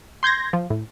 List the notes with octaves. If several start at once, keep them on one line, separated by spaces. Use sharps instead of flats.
C6 G6 G#6 A#6
F3
A2